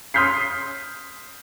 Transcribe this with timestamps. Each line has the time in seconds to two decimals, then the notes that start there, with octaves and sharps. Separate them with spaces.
0.14 C6 D#6 F6 G6 B6 C7